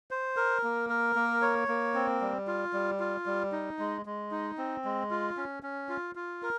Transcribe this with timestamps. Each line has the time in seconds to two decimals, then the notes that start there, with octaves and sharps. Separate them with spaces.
0.11 C5
0.37 A#4
0.63 A#3
0.90 A#4
1.16 A#3
1.42 C#5
1.68 A#3
1.94 C4
2.21 G3
2.47 F4
2.73 G3
3.00 F4
3.26 G3
3.52 D#4
3.79 G#3
4.06 G#3
4.31 D#4
4.58 C4
4.85 G#3
5.11 F4
5.37 C#4
5.63 C#4
5.89 F4
6.15 F4
6.43 A#4